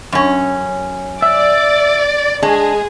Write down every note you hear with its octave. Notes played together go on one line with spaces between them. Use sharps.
F#2 C#4
D5 E5
G#3 D4 G#4